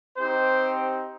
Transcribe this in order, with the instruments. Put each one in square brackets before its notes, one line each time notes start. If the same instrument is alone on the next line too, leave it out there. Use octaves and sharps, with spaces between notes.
[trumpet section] C4 D#4 G4 C5